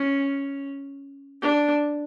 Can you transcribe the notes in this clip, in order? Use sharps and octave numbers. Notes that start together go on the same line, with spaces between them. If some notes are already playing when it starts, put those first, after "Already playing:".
Already playing: C#4
D4